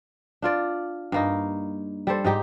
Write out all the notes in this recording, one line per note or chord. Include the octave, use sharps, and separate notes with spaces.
D4 F4 D5
G2 A#3 D#4
G3 A4 C5
G#2 D#4 G4